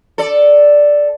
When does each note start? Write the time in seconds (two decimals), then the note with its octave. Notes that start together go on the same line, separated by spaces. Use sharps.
0.18 A4 D5